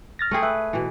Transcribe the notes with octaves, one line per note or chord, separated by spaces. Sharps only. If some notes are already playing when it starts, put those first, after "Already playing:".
F6 A6 A#6
A3 C4 G#4
B4 E5
B2 E3